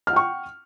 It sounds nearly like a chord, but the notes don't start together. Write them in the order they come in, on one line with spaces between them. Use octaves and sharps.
F6 F#5 G5 C#6